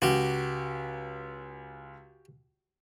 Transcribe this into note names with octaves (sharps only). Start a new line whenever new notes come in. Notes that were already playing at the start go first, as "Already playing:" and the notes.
C#2 F#4 G4